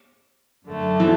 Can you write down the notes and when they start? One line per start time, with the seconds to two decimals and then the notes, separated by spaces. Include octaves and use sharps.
0.67 F#2 D3 A3
1.00 E3